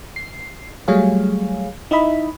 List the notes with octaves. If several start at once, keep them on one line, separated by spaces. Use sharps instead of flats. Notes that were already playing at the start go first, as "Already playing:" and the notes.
C7
F#3 G3 A3 G#4 C#5 F5
D#4 E4 D#5 E5 B5